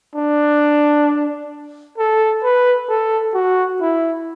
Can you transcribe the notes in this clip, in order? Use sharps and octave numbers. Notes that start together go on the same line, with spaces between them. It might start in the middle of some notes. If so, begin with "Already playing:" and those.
D4
A4
B4
A4
F#4
E4